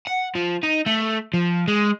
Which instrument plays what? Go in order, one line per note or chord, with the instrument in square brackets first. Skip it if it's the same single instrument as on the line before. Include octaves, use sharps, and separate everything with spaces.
[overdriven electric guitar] F#5
F3
D#4
A3
F3
G#3